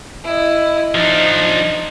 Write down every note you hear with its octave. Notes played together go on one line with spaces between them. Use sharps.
E4 D#5
F3 D4 D#4